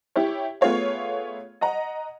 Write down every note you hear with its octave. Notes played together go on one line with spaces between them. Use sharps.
E4 G4 C#5
A3 B3 F4 G#4 C#5 F5
D#5 F#5 A#5